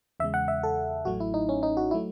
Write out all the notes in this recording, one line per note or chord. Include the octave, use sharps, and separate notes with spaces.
E2 C#3 G#3 E5
F#5
E5
A4
A1 A2 F#3 A3 F#4
E4
D#4
C#4
D#4
F#4
E4
F#3 A3